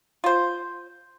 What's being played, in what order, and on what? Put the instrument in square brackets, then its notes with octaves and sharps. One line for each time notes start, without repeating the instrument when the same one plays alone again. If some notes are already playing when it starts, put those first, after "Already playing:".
[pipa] F4 C5